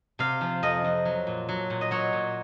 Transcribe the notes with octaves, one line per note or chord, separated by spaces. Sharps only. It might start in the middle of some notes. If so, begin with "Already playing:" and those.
C3 F5
F3
F2 D#5
F2
F#3
A#2
F#3
A#2
D#5
F#3 C#5
A#2